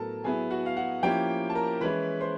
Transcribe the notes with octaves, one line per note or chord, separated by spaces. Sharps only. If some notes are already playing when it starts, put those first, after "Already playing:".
Already playing: A2 F#3 B3 A4 A#4 A5
F#3 B3 E4 G#4 G#5
F#4 F#5
F5
F#4 F#5
F3 A#3 C#4 E4 G4 G5
A5
A#4 A#5
E3 G#3 C#4 E4 B4 B5
C5 C6